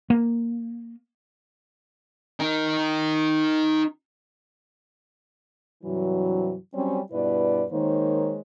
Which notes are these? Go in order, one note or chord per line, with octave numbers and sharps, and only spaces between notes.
A#3
D#4 A#4
G2 C3 E3 F#3
F#3 G3 C4 C#4
G2 B2 E4 B4 D5
D#3 G#3 A#3 D#4 C5 C#5